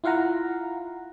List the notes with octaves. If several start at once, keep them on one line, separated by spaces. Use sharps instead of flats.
E4 F4 F5 F#5 A#5